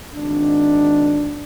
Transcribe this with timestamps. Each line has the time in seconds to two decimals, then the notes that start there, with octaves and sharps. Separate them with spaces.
0.15 G#1 D4